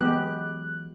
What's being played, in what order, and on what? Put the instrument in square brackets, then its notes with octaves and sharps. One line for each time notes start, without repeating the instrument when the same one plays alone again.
[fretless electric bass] E3 F#3 [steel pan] G#3 B3 G4 [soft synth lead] F#6